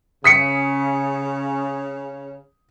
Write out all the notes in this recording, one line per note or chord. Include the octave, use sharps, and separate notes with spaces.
C#3 D#6 B6 C#7